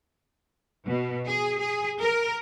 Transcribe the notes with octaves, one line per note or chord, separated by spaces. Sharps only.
B2
G#4
G#4
A#4